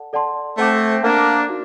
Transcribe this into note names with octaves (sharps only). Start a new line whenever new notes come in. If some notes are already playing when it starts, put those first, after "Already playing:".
Already playing: A4 D5 F#5 A5
A4 D5 F#5 A5 C6
A3 C4 C5 F#5 A5 D6
A#3 D4 C5 F#5 A5 D6
D#4 F#4